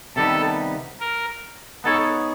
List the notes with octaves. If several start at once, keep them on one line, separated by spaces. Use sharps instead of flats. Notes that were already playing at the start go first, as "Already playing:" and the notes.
C3 D#3 G3 B3 A4
A#4
B3 D#4 G#4 A4 C#5